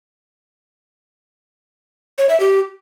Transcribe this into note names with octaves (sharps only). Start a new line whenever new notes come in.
C#5
E5
G4